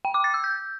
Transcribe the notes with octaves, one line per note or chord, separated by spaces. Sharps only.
G5
D6
A6
E6
G6